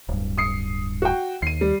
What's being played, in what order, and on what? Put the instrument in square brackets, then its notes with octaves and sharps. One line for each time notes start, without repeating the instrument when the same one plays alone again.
[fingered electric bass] D1 G2
[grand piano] D#6 C7 C#7
F#4 G5
[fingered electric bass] D#2 [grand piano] C7 D#7
[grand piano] G3